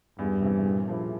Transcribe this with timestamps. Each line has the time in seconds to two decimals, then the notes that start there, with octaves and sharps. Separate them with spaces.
0.19 E2 G2
0.42 C3 E3
0.65 A#2
0.88 F3 A#3 E4